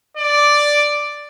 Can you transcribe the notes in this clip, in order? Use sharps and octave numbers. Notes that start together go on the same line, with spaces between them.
D5